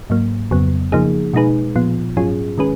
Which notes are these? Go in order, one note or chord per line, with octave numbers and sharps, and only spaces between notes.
G#2 F#3 A#3
F2 C#3 F#3 B3
C#3 F3 A#3 D#4 G#4
B2 G#3 D#4 G#4 B4
A#2 F3 B3 F4
G#2 F#3 C#4 F4 G#4
D#3 G#3 C#4 G#4 B4